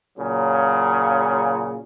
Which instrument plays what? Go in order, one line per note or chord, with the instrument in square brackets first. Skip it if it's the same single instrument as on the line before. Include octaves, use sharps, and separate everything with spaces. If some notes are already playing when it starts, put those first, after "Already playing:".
[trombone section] A#2 C#3 F#3